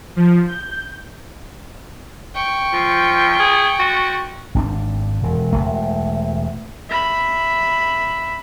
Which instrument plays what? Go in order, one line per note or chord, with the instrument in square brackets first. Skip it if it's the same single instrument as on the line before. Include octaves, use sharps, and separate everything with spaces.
[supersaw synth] F3
G6
[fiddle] G5 C#6
[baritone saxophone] F3
G#4
F#4
[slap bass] G#1 C#4 D4
E1
E1 A3
[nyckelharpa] E5 B5